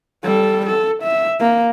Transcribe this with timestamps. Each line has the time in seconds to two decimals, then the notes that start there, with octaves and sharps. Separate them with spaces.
0.24 G3 A4
0.66 A4
1.03 E5
1.40 A#3